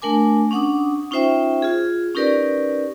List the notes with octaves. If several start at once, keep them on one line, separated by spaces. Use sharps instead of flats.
A3 D4 A#4 G#5 D6
C#4 D4 F#5 D6 D#6
C#4 D#4 F4 C5 E5 G5
F4 G#4
C#4 D#4 G4 A#4 B4 D5